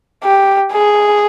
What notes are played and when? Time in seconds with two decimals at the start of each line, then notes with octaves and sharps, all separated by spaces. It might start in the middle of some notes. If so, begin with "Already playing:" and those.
0.24 G4
0.73 G#4